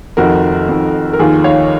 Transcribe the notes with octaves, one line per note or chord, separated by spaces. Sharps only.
F1 F2 D#3 F#4 A#4
F1 F2 D#3
A#4
F1 D#2 D#3 F4 G#4
C#5 F5